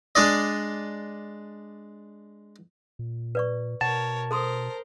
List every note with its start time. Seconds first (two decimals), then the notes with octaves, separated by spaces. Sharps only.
0.15 G#3 D4 D5 D#5
2.99 A#2
3.35 B4 D5 C#6
3.81 B2 A#4 C#5 F#5 A5
4.31 A4 A#4 C5 C6 D#6